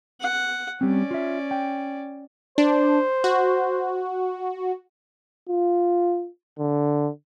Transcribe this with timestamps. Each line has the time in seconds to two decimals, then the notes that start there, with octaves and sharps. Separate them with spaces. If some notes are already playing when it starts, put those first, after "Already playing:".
0.21 F#5
0.81 G3 C4 C#4 D5
1.11 F4 E5
1.51 G5
2.58 D4 C5
3.24 F#4
5.50 F4
6.59 D3